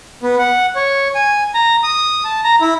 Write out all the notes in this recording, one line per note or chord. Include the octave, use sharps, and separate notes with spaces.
B3
F#5
C#5
G#5
A#5
D#6
A5
A#5
E4